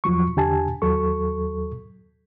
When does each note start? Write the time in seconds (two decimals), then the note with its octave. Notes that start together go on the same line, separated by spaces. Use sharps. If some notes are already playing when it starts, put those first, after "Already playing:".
0.04 E2 F3 F#3 C#6
0.37 E2 D3 G4 G#5 A5
0.82 D#2 F#3 A4 C#6